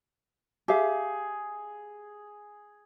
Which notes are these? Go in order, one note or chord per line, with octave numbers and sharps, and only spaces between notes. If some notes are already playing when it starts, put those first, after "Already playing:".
G4 G#4 E5 F5